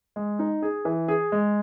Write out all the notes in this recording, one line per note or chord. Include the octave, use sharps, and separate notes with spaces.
G#3
D#4
G#4
E3
G#4
G#3